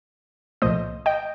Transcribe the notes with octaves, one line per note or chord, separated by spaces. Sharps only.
C2 A#2 F3 A3 C5 D#5
D#5 G5